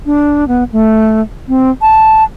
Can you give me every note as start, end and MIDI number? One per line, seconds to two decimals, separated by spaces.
0.06 0.45 62
0.48 0.64 59
0.72 1.21 57
1.48 1.70 60
1.82 2.24 81